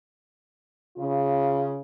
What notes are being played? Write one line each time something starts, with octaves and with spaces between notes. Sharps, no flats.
C#3 F4